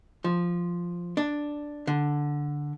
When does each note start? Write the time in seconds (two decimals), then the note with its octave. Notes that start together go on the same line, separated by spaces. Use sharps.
0.24 F3
1.17 D4
1.87 D3